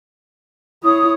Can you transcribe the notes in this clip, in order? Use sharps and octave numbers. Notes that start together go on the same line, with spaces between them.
E4 C#5 D#6